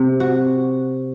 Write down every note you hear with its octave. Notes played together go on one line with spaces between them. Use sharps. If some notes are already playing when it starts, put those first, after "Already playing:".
Already playing: C3
F#4